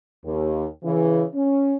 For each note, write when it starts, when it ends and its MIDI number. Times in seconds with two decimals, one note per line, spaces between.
0.25 0.64 39
0.84 1.23 49
0.84 1.23 52
1.35 1.76 61